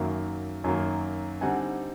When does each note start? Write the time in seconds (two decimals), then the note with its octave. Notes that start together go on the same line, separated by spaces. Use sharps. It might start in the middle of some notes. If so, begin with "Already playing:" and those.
Already playing: F#2 D#3 F#3 A#3 E5 F#5
0.64 F#2 D#3 F#3 A#3
1.41 D3 G3 C4 D#4 F#5 G#5